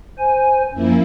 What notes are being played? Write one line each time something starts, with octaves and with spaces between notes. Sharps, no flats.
C5 G#5
F#2 F3 A#3 E4